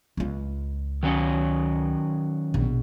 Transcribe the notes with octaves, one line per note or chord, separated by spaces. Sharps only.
C#2 F4
D#3 F#3 C#4
A#1 B2